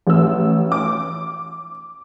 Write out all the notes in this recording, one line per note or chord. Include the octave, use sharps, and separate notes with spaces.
A1 E6
D6